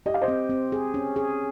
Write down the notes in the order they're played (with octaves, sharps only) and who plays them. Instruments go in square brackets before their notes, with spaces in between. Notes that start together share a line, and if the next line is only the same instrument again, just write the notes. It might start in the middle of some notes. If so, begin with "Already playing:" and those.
[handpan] G4 [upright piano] D#5
[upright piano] F5
C5 D#5
[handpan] C4
C4
G#4
C#4
G#4